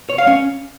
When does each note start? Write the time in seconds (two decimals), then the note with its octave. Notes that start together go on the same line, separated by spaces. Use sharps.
0.10 C#5
0.18 F5
0.27 C#4